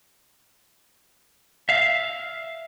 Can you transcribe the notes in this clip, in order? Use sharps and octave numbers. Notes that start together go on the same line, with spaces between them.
E5 F5